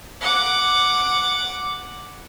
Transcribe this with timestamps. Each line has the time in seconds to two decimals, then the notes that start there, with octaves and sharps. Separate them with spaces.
0.21 F#5 D6